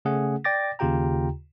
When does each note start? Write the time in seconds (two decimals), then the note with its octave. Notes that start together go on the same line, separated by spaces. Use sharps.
0.05 C#3 A3 C#4 G#4 F#5
0.44 D5 G5 D6 A6 A#6
0.79 D#2 C#3 F4 G4 G5 A#5